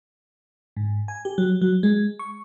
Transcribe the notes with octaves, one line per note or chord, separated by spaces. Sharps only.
G#2
G#5
G4
F#3
F#3
G#3
C#6